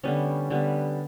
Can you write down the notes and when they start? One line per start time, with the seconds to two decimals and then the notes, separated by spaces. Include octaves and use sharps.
0.04 D3 G3 B3 C#4
0.50 D3 G3 B3